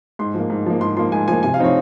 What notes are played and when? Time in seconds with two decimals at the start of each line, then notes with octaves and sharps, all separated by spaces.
0.19 G#2 C6
0.34 F3 A#3
0.50 G#2
0.66 F3 A#3
0.81 G#2 C6
0.97 F3 A#3 C6
1.12 G#2 G#5
1.28 F3 A#3 G#5
1.43 C3 G#5
1.54 F5
1.59 F3 C4 D#4 C#5